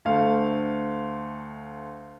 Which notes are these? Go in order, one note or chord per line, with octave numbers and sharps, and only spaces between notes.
D2 A3 F5